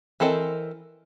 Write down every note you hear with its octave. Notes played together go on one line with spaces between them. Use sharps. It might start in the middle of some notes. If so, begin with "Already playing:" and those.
E3 C4 A4 A#4 D#5